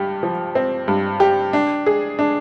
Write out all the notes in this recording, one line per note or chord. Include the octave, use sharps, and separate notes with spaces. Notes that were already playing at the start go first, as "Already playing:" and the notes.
Already playing: G2 G4
F3
C4
G2
G4
D4
G#4
D4